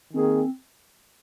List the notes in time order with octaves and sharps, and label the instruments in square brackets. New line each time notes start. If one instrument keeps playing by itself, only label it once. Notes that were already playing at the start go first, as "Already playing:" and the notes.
[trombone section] D#3 A#3 G#4 [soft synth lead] C4